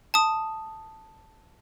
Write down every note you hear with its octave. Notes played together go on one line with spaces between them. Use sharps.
A5 D#6